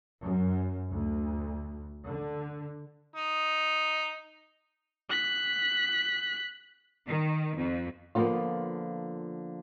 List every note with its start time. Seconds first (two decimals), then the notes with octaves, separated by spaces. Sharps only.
0.21 F#2
0.91 D2
2.09 D3
3.16 D#4
5.10 F#6 B6
7.08 D#3
7.58 F2
8.15 D3 F3 A#3 B3 D#4 F4